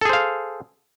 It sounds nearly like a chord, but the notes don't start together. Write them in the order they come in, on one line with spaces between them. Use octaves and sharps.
A4 G#4 C5 F5